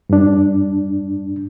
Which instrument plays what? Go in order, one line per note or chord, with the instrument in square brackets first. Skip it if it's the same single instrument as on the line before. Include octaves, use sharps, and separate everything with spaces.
[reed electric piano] G2 D4